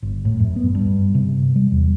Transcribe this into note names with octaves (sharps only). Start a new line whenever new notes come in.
G1
A2
F#2
B3
G2
C3
G3
E2